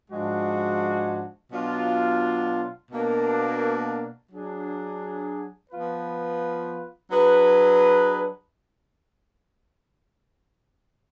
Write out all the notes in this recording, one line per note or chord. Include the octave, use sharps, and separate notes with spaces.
G#2 F3 G#3 D4 F#4
B2 F#3 D4 F4
B2 A#3 D4
F#3 D4 G#4
F3 B3 F4 B4
F#3 D4 G#4 B4